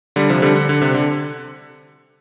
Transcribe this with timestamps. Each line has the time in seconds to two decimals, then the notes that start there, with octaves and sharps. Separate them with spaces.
0.16 D3 G3
0.29 C3 F3
0.42 D3 G3
0.55 D3
0.69 D3
0.82 C3
0.95 D3